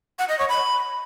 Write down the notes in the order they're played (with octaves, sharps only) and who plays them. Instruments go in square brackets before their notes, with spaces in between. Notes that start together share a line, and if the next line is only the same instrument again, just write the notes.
[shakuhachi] F#5
D#5
C#5
B5